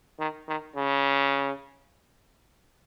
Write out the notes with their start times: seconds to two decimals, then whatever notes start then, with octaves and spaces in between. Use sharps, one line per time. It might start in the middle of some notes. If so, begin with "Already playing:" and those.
0.19 D#3
0.48 D#3
0.76 C#3